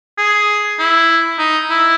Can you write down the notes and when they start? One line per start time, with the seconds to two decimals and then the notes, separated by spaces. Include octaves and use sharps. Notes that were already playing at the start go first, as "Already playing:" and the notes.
0.18 G#4
0.79 E4
1.38 D#4
1.70 E4